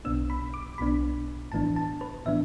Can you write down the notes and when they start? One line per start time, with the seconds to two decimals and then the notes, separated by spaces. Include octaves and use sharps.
0.05 B1 B2 B3 D4 E6
0.30 B5
0.54 D6
0.78 B1 B2 B3 D4 B5
1.52 A1 A2 E3 B3 D4 A5
1.76 A5
2.01 B4
2.26 A2 E3 B3 D4 E5